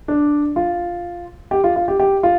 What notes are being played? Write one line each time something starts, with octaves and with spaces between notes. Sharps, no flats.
D4
F4
G4
F4
F4
G4
G4
F4